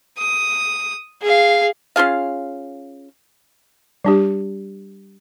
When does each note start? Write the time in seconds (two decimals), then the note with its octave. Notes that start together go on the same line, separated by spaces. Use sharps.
0.18 D#6
1.22 G#4 F5
1.96 C#4 F4 G#4 F5
4.04 G3 D4 G4